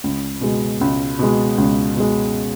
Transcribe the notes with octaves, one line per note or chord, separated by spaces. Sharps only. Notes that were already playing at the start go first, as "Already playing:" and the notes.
C#2
B2 G#3
C#2
B2 G#3
C#2
B2 G#3